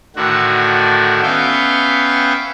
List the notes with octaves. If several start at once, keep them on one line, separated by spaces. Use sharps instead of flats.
A2 D3 D#3 F#4
B3 C#4 E5 F5 G5